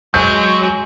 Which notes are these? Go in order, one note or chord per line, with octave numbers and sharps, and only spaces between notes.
F#3 G#3 G6